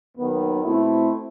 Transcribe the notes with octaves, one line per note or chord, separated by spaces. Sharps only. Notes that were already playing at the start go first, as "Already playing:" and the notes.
D#2 D#3 F#3 B3
B2 A3 C4 E4